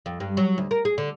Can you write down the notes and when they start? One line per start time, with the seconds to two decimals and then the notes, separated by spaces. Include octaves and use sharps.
0.06 F2
0.20 G2
0.37 F#3
0.58 D2
0.71 A#4
0.85 G#4
0.98 D3